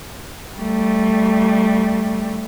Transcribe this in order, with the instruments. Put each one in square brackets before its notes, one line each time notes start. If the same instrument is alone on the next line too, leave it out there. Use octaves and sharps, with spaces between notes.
[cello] G3 A3